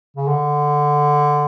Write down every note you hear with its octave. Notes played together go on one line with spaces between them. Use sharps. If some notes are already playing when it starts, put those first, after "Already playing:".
C#3
D3